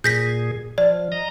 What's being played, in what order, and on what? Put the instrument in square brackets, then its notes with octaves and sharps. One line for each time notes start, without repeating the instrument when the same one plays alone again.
[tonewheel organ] A#2 G#4 [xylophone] G6 A#6 B6
[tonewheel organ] F3 [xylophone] D5
[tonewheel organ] D#5 A#5